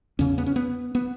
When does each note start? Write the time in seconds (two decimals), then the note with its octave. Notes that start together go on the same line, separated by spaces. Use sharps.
0.19 E2 C#3 C#4
0.38 B3
0.46 C#4
0.56 B3
0.95 B3